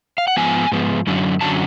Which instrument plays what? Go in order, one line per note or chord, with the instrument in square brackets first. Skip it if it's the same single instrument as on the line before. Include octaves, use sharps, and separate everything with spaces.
[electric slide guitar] F5
F#5
G#2 F3 B3 G#5
G#2 F3 B3
F#2 D3 F#3 C#4
F#2 D3 F#3 C#4 A5